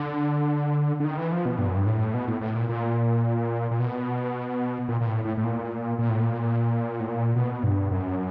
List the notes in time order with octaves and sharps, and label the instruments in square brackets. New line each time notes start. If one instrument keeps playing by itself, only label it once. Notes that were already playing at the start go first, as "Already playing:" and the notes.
Already playing: [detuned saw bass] D3
D3
D#3
E3
F3
B2
G2
F#2
G2
A2
B2
A2
A2
A#2
A#2
A#2
B2
A#2
A#2
A2
A2
A2
A#2
A#2
A2
A#2
A2
A#2
B2
G2
F#2